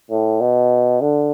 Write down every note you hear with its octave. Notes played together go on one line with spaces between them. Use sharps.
A2
B2
D3